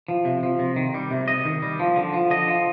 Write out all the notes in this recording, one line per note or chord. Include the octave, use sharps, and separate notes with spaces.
F3
C3
F3
C3
D#3
G3
C3
C3 D#5
D#3
G3
F3
D3
F3
D3 D#5
F3